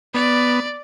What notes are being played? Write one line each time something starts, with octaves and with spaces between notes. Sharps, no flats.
B3 D5